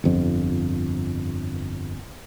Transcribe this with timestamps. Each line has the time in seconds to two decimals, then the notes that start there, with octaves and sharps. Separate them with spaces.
0.04 G1 F2